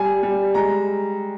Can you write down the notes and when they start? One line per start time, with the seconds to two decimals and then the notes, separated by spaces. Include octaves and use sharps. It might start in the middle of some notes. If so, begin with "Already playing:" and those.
Already playing: G3 G#5
0.23 G3
0.54 G#3 A#5